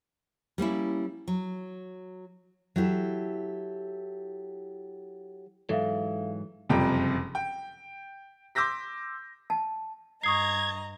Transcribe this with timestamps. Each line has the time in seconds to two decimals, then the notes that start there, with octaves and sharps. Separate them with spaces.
0.58 G3 A#3 C#4 E4
1.28 F#3
2.76 F#3 E4 G4 A4
5.69 G#2 E3 F#3 A4 E5 F5
6.70 F#1 F2 C3 G3 G5
7.35 G5
8.55 C6 D6 E6 G6 A#6 B6
9.50 A5
10.23 G2 D#5 A#5 C#6 D#6 G#6 C7